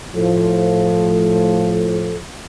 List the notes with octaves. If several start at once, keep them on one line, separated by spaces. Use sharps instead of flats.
A2 F3 A4